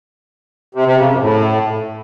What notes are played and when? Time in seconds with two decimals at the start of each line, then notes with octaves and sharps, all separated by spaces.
0.75 C3
0.86 C3
0.98 C#3
1.09 F#2
1.21 A2